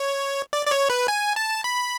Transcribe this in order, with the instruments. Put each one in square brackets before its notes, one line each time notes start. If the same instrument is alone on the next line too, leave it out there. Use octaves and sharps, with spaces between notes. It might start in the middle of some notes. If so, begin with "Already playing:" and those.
Already playing: [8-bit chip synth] C#5
D5
D5
C#5
B4
G#5
A5
B5